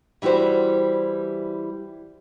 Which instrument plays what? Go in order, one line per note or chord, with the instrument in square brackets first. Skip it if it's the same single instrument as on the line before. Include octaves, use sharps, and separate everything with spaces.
[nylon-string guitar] E3 G3 E4 F#4 C5